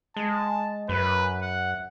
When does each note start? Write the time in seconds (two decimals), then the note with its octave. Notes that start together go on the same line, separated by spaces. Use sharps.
0.16 G#3 A5
0.89 F#2 B4
1.42 F#5